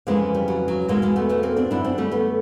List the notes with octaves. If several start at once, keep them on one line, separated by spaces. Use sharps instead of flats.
F2 C#3 E3 G#3 A#3
G3
F#3
F#3
E2 B2 G#3 A#3
G#3 A#3
A3 B3
A3 B3
A#3 C4
C4 D4
F#2 D3 D4 E4
C4 D4
G3 A3
A3 B3